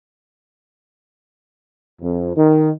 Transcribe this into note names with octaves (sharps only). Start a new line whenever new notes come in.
F2
D#3